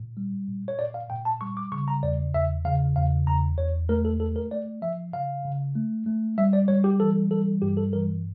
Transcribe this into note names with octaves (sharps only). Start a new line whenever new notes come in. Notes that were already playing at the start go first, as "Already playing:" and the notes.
Already playing: A#2
G3
A#2
C#5
A#2 D5
F5
A#2 G5
A5
G3 C#6
D6
C#3 C#6
A#5
E2 D5
E2 E5
C#3 F5
E2 F5
E2 A#5
E2 C#5
A3 A#4
A4
A3 A4
A#4
A3 D5
F3 E5
C#3 F5
C#3
A3
A3
G3 E5
D5
G3 C#5
G4
E3 A4
G3 A4
G2 G4
A4
E3 A#4